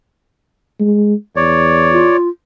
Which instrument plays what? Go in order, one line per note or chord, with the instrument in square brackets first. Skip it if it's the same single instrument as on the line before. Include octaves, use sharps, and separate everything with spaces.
[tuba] G#3
[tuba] E2 [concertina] C#5 D5
[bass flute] F4